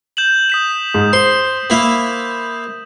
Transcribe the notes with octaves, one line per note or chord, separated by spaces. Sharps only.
G6 E7 F#7
D#6 B6 E7
G#2
C5 C6
A#3 E4